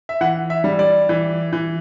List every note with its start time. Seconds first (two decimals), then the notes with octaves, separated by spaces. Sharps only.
0.09 E5
0.21 E3 F#5
0.50 E5
0.64 G3
0.79 D5
1.09 E3
1.53 E3